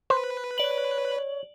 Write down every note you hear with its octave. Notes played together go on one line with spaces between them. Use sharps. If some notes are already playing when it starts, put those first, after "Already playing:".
B4 C5
C#5 D5 F#7